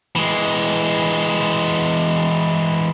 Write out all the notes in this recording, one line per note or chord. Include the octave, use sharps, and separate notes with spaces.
E3 G#3